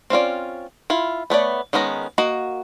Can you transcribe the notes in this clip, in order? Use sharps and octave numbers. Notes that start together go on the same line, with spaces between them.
C4 C#4 F4 D5
E4 F4
A3 B3 C#5 D5
D#3 G#3 B3 C#4 A#5
A#3 F#4 D#5